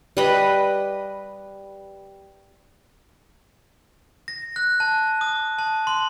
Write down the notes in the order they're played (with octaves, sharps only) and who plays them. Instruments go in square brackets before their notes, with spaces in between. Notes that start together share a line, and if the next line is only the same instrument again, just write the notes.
[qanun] G3 B4 D#5
[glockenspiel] A#6
F#6
A5
D#6
A5
C6